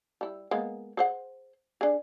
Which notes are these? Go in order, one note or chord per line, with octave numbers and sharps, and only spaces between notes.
G3 E4
G#3 A#3 B3
G#4 C5 F#5
D4 G#4